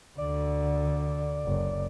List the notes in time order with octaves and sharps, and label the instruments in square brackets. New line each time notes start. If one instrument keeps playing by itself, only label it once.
[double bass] D2 D3 [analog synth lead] D5
[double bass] F#1